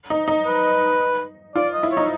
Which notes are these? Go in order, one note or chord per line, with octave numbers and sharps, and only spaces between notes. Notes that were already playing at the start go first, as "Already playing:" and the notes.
D#4
D#4
B4
F4 D5
D#5
E4
D#4 C#5